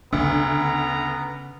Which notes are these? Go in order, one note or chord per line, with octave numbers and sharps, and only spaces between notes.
D2 C#3 B3 A#5